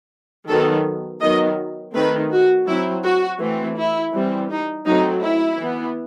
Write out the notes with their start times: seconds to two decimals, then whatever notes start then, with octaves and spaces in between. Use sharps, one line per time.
0.48 D#3 F#3 B3 A4
1.21 D#3 F#3 B3 D#5
1.94 D#3 A3 C4 B4
2.32 F#4
2.67 F#3 C4 E4
3.04 F#4
3.40 E3 A3 C4
3.77 E4
4.13 E3 G3 C4
4.50 D#4
4.86 F#3 A3 C4 D#4
5.22 E4
5.59 E3 B3